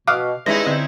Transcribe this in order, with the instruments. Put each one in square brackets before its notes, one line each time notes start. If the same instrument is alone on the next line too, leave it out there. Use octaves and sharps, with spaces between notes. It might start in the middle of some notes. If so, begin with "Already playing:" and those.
[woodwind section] B2 [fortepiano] F5 D6 [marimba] D#6 F6 F#6
[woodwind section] G2 D#5 E5 [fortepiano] G#3 [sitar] C#4 D#4 E4 [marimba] A#6
[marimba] D3 [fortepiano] C4